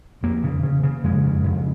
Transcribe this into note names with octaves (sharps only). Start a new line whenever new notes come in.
F2 A#3
C#3
C#3
C#3
F2 G#3
C#3
F2